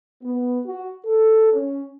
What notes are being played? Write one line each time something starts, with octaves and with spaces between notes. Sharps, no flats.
B3
F#4
A4
C#4